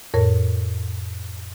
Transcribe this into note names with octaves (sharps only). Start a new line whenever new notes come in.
F2 A2 A#4 C#5